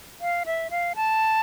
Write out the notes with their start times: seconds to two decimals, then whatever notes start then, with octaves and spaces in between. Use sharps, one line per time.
0.21 F5
0.46 E5
0.70 F5
0.96 A5